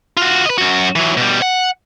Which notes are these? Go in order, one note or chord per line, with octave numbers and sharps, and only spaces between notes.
F4 F#4
B4 D#5
F#2 F#4
E3 F#3
B2 G3
F#5